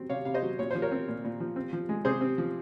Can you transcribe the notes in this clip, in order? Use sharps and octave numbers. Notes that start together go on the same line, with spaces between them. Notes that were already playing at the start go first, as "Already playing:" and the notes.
Already playing: F#3 C4
C3 C#5 F5
C3 F5
C5 D#5
F#3
A#2 C#5
F3 C5
A#4 C#5
C4
A#2
A#2
F3
C4
F3
G#3
C3 G#4 C5
C4
F3